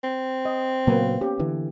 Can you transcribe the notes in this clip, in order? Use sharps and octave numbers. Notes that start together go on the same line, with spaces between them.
C4
D#5
A#2 C#3 F#3 A#3 B3
C#4 G4
D3 E3